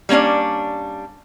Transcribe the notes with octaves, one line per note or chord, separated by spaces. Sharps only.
G3 A#3 C#4 D4 D5